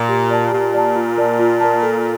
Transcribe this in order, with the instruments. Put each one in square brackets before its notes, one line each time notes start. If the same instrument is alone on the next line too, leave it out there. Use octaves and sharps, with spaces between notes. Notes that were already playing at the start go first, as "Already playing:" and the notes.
Already playing: [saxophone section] A#2
[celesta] G4
D5 A5
[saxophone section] A#2 [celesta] G4
[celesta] D5 A5
F4
A#4 D5 A5
F4
A#4 D5 A5
A4